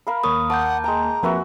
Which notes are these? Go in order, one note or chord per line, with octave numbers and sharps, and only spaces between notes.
A#4 F5 B5
D#2 A#3 C#5 D#6
F#5 A5 D6 G6
G#3 G5 A#5
F2 A#3 F#4 B4 E5 G#5